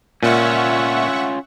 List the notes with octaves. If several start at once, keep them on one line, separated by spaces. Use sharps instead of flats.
A#2 C#4 F4 E5 F#5 C#6